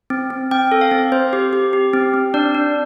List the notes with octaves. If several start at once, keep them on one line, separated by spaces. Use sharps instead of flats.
C4
C4
C4 G5
A4
F5
C4
C4 C5
G4
G4
G4
C4
C4
D4 D5
D4